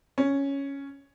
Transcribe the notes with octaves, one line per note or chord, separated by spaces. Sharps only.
C#4